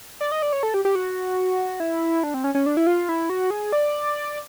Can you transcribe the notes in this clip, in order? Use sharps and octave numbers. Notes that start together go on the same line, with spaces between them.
D5
D#5
D5
C#5
A4
G4
G4
F#4
E4
D4
C4
C#4
C#4
D4
E4
F4
E4
F#4
G#4
D5